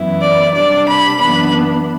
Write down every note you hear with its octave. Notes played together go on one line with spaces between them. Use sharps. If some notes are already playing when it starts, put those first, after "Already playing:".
Already playing: F#2 E3 B3 E4
D5
C3 G3 D4 D5
B5
F#2 E3 B3 D4 B5